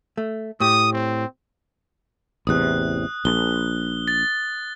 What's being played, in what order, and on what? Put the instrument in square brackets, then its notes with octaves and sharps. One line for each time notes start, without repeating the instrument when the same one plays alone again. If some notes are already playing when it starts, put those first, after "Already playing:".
[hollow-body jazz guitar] A3
[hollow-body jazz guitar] A2 G4 [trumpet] D#6
[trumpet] C4
[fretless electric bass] A1 E2 C3 [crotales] D#6 F#6
[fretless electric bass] A#1 [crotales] G7
[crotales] A6